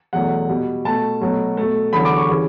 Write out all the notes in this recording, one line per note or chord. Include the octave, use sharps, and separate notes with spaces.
E2 B2 F#3 A3 F#5
B2 G3
B2 A3 A5
B2 F#3 A3
B2 A3
E2 D3 F#3 B5
D6
C#6
C#3 E3 G3